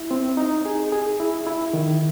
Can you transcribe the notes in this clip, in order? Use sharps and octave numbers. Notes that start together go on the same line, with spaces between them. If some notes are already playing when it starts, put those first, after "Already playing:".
Already playing: E4
C4
D#4
G#4
G#4
E4
E4
D#3